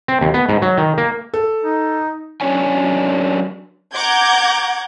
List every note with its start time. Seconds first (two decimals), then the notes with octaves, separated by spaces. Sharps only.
0.08 C4
0.21 D#2
0.34 B3
0.49 G#2
0.62 F#3
0.78 D#3
0.98 A#3
1.34 A4
1.64 D#4
2.41 F#3 C#4 D4 C#5 G#5
3.94 F#5 A#5 D6 G6 G#6